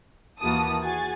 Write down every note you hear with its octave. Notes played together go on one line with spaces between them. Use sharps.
D#2 E3 A#3 F#4 A5 D#6
F#4 G#4 G#5 A6